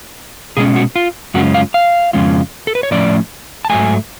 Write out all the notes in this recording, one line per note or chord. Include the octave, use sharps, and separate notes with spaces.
B2 G#3 C#4 G#4
F#4
F4
F#2 C#3 G#3 C#4 F4 F#4
F5
F5
F2 C#3 G#3 C#4 F4
A4
B4
C#5
A2 F3 A3 C#4 D5
A5
G#2 F#3 A3 G#5